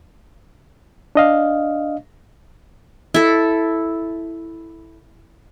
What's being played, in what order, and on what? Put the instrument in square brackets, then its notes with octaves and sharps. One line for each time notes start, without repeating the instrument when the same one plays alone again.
[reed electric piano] D4 D#5 F5
[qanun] E4 A4